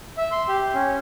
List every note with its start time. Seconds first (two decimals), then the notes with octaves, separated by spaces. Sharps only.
0.17 E5
0.32 C6
0.48 G4
0.74 C#4